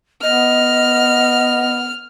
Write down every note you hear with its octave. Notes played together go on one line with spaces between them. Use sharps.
B3 D#5 F6